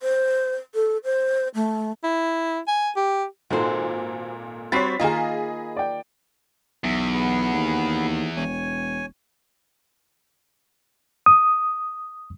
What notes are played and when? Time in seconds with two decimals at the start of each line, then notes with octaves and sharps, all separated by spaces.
0.01 C5
0.75 A4
1.04 C5
1.55 A3
2.04 E4
2.67 G#5
2.96 G4
3.50 G#1 A#2 D#4 F#4 A4 C5
4.72 G3 C4 F#4 C#5 B5 A6 B6 C7
5.00 D#3 A#3 F4 G#4 D#5
5.77 D5 G5
6.84 B1 E2 E5
7.14 B3 G#4
7.54 D#2
8.37 E1 C#5 G#5
11.26 D#6